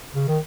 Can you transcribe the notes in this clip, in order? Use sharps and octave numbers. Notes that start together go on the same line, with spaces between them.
C#3
D#3